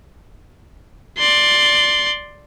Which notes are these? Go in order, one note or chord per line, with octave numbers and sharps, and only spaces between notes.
D5 C6